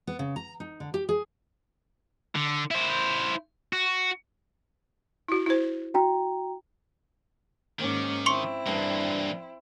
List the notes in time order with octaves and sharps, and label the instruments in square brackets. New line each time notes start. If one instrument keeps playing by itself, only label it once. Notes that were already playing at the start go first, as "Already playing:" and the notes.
[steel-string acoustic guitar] B3
C#3
A#5
D#4
D3
G4
G#4
[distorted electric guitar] D3
E4 C5
F#4
[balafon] E4 F#4
E4 C5
[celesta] F#4 G5 A#5
[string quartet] G#2 C#4 D6 [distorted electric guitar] D#3 [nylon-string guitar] A#3
[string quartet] C4 E4 [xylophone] C6 C#6 C#7
[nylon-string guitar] G2 D4 [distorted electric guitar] E3 A#3